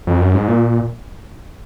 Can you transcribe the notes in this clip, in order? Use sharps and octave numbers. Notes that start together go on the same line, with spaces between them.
F2
F#2
G#2
A#2